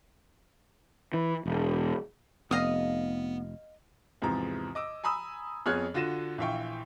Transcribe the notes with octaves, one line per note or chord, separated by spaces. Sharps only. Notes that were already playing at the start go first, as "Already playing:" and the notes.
E3
E1
F1 B3 D#5 F5 D#6
E2 G#2 C3 F3 A#5
D#5 D6 E6
G#5 A#5 B5 D#6 E6
F2 B3 G#4 C#5 F6 F#6
D3 F4 F#4 A#6 D#7 E7
A#1 E3 E5 F5 G5 C#6